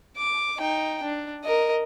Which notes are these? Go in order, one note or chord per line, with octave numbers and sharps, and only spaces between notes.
D6
D#4 G5
D4
A#4 D#5